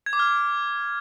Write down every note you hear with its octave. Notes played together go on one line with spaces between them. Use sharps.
G#6
D6
F6